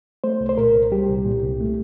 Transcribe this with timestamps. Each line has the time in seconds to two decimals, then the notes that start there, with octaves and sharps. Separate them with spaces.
0.24 A3 C5
0.41 C2
0.49 C5
0.58 A#2 A#4
0.74 C2
0.92 G3 G4
1.09 C2
1.26 A#2
1.42 C2
1.61 A3